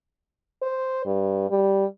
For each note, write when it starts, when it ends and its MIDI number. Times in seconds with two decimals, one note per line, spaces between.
0.62 1.01 72
1.05 1.50 43
1.50 1.85 55